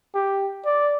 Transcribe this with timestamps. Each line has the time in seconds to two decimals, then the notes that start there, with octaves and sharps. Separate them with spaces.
0.15 G4
0.65 D5